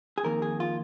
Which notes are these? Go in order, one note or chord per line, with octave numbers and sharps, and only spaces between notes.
G#4
F2 D#3 A#3 A#4
G#4
F4